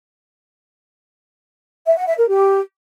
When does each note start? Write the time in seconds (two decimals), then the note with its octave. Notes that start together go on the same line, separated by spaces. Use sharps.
1.86 E5
1.97 F#5
2.08 E5
2.18 A#4
2.29 G4